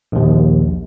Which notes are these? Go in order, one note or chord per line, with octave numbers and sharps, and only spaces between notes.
A#1 D#2